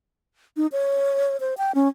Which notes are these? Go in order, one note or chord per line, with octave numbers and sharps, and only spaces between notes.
D#4
C#5
C5
G5
C#4